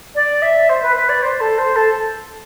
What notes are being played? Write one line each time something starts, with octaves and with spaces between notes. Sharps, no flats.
D5
E5
C5
B4
B4
D5
C5
A4
C5
A4